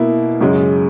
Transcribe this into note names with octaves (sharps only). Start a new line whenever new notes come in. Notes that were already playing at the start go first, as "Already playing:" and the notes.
Already playing: B2 A#3 E4
F#2 C#3 G#3